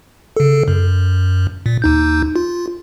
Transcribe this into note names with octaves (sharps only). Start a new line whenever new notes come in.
C#3 A4
F#2
A#2
D#2 D#4 G6
F4